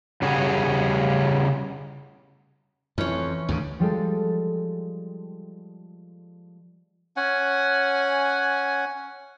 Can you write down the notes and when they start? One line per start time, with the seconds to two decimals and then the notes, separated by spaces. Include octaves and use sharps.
0.22 C#3 G3 C#4 F#4 G#4
2.98 F2 E3 C#4 C#5
3.49 D2 G#2 C#3
3.79 F3 G3 G#3 A4
7.16 C#4 F#5 G#5